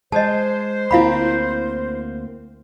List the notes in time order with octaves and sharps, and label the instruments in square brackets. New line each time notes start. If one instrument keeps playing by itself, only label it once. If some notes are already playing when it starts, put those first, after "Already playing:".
[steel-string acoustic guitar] G#3 [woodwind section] C5 [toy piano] D#5 A5
[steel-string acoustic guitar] D2 A#3 C4 [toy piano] E4 F5 B5